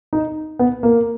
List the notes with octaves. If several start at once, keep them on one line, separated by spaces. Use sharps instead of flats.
D#4
B3
A#3